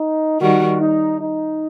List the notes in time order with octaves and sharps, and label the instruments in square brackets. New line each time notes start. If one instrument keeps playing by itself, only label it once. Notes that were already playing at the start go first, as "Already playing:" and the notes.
Already playing: [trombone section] D#4
[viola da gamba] D#3 G3 [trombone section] F#4
[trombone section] D#4
D#4